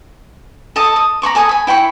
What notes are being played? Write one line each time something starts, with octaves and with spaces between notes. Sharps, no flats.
A4 D#5 A5 D#6
D#6
A#5 B5 C#6 D6
A4 G#5 C#6 D#6
G#5 B5
E4 G5 B5 C#6